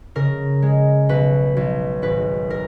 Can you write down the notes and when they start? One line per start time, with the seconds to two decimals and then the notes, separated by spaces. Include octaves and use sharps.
0.15 C#3 A#4
0.62 G#3
1.09 B1 B4
1.57 B1
2.02 G#1 B4
2.50 A#4